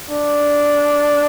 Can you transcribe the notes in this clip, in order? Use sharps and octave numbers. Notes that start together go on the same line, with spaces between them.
D4